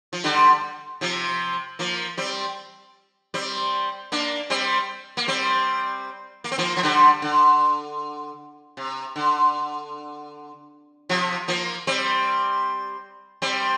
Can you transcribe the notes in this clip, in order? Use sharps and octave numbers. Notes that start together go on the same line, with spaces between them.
F3
D3 G3
C3 F3
F3 A#3
G3 C4
G3 C4
A#3 D4
G3 C4
A#3
G3 C4
A#3
C4
F3 A#3
F3
D3 G3
D3
C3
D3
C3 F3
F3 A#3
G3 C4
G3 C4